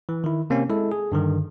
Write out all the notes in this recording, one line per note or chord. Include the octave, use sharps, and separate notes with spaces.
E3
D#3 E4
C3 A#3 C4 C#4
G#3 E4 A4
G#4
G2 D3 D#3